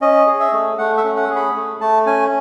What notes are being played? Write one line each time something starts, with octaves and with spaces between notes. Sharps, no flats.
C#4 D#5
G#4
E5
A3
A3 F#5
E5
C#4
F#5
G#4
B5
A3
A3 A5
C#4 G#5